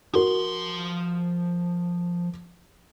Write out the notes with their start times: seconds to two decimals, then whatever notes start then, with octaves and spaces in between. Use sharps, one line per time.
0.14 F3 F#4 A#4 C6